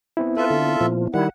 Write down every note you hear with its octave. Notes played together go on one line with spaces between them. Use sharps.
B3 C4 E4
F4 A4 B4 E5
D3
A#2 F3
D#3 G3 E4 F#5